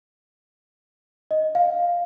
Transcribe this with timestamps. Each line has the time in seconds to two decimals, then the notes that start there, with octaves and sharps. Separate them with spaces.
1.31 D#5
1.55 F5